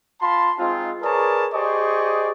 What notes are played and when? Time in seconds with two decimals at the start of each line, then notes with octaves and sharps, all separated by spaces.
0.21 F4 A5 B5 C6
0.58 G#3 C4 D#4 F4
1.02 G#4 A#4 B4 C#5 D5 A5
1.53 G4 G#4 C5 D5 D#5 C#6